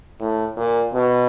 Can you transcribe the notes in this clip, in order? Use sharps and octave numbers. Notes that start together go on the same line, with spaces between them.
A2
A#2
B2